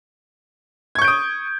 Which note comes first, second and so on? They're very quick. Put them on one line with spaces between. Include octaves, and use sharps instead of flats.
G#6 C#6 G6 D7 D#6